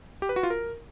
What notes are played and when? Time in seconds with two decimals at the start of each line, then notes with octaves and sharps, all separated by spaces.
0.22 G4
0.29 B4
0.36 F#4
0.43 F4
0.50 A#4